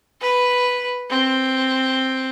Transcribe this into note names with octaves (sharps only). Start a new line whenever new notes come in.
B4
C4